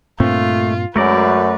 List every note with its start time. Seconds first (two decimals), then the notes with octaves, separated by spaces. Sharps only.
0.20 G2 A#2 A3 C4 F4
0.96 F#2 G#3 A3 A#4 B4 D5